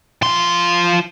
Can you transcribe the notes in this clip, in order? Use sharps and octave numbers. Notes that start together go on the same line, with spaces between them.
F3 C6